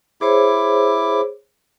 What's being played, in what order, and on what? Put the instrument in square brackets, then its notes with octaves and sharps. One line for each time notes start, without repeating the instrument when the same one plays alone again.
[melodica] E4 D6 [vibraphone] G#4 C5 C#5